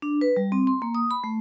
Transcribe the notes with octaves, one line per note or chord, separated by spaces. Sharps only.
D4
B4
G3
C4
C6
A#3
D#6
B5
A3